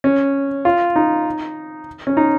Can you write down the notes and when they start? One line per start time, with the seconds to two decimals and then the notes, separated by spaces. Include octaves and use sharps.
0.04 C#4
0.65 F4
0.96 D#4
2.07 C#4
2.17 D#4